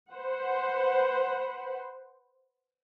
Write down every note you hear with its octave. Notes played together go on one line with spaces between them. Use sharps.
B4 C5 F#5